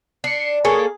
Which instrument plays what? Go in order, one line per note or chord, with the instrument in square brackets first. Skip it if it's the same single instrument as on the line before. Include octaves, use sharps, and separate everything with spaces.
[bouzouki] D4 [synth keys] C7 C#7
[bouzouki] A#3 A4 C#5 [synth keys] G#4